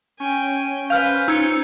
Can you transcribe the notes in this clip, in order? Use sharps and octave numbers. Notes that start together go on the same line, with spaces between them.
C#4 G5 G#5
B4 C5 F5 F6 G6
D#4 F4 C5 E6 G#6 C#7